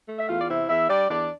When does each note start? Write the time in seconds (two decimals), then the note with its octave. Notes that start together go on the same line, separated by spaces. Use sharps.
0.08 A3
0.19 E5
0.29 E2 F4 F5
0.40 D5
0.49 C3 E4 E5
0.69 E2 E4 E5
0.89 G3 D4 D5
1.10 E2 D4 D5